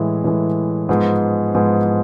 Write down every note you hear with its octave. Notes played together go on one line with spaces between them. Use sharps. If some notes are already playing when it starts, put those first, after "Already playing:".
Already playing: A2 E3 G#3
A2 E3 G#3
G#2 F3 G#3 B3
G#2 F3 G#3 B3